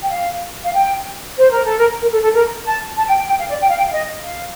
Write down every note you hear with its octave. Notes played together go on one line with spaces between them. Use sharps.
G5
F5
F5
G5
C5
A#4
A4
A#4
A#4
A4
A4
A#4
A5
A5
G5
G5
G5
F5
D5
G5
F5
G5
F5
D#5
F5